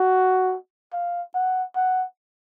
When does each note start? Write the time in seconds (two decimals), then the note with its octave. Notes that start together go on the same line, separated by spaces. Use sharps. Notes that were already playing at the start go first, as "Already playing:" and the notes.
Already playing: F#4
0.93 F5
1.35 F#5
1.76 F#5